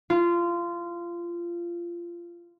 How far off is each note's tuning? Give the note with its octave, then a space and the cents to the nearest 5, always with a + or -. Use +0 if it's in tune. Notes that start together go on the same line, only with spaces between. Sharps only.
F4 -20